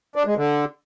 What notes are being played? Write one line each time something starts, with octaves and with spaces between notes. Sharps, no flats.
D4
G#3
D3